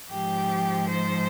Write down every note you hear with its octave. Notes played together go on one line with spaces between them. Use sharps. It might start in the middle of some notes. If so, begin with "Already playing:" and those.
G#2 F3 G4
C5